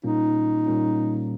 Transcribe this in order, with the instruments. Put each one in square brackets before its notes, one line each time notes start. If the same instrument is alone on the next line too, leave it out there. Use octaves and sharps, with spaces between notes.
[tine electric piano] A#2 G3 A#3 C#4 F4 [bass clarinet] D#4
[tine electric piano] A#2 G3 A#3 C#4 F4